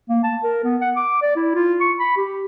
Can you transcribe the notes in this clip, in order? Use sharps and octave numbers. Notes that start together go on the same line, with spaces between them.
A#3
A5
A#4
B3
F#5
D6
D5
E4
F4
C#6
B5
G4